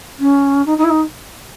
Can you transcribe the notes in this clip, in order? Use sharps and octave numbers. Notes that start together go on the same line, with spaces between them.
C#4
D#4
D#4
E4
D#4